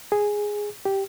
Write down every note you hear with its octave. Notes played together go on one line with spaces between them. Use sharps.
G#4
G4